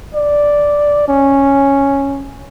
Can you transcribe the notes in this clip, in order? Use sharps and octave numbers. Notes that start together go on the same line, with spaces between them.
D5
C#4